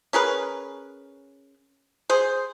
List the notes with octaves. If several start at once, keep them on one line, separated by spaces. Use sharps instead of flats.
C#4 G#4 A#4 B4
G#4 C5